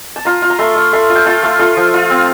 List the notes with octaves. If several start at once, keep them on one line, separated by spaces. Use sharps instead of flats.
A5
F4 A#5
F4
A#5
A3 C6
A3
A3 C6
F4
G5
F4 A5
A3 F5
F4 A4
F3
F4
C4